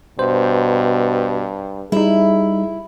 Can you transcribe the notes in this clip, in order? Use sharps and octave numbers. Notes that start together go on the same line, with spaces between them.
G2 B2 C5
G3 D#4 E4 G#4